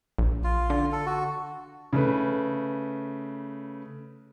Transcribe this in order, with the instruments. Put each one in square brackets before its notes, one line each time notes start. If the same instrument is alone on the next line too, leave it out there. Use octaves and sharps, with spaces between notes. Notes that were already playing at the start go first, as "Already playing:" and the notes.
[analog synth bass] A#1
[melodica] F4
[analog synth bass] D3
[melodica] A4
F#4
[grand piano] C#3 A3 B4